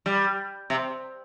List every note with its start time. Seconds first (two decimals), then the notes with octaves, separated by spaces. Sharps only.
0.06 G3
0.70 C3